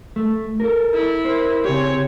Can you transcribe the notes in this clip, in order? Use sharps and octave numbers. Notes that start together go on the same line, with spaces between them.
A3
A4 A#4
E4
A#4 C5
C#3 C4 G4 C#5